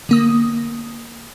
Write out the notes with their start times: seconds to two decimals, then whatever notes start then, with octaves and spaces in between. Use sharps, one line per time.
0.09 D3 A#3 D#6